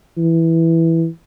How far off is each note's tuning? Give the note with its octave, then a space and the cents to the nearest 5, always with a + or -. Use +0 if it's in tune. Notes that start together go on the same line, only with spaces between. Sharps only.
E3 -5